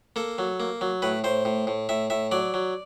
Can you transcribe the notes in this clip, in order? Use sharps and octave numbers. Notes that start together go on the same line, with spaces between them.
A#3 A4
F#3
A#3
F#3
A2 B4
A2 C5
A2
A2
A2 E5
A2 E5
F#3 D5
F#3